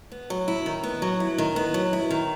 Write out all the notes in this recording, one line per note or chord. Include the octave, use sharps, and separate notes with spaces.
B3
F#3
E4
D#3
B3
F#3
E4
D#3
B3
F#3
E4
D#3